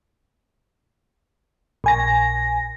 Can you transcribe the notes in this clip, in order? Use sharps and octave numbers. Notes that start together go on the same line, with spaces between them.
A#1 G#5 A#6